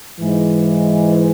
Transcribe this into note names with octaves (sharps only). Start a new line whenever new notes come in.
G#2 E3 G#3